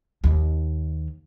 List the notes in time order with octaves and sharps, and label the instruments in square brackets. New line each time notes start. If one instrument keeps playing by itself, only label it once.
[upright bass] D#2 D#3